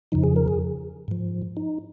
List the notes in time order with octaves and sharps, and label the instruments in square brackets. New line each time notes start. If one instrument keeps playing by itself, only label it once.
[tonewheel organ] F2 C#3 F3 D#4
G#4
A#4
G#4
G#2 F3
D#4